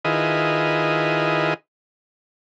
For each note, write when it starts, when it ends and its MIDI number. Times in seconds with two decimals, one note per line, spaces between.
0.05 1.54 51
0.05 1.54 64
0.05 1.54 65
0.05 1.54 68
0.05 1.54 71
0.05 1.54 75